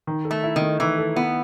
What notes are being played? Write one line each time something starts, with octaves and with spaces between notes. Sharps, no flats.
D#3
A4
A3
E4
D#3
A3
D#3 E3
A4
B3 E4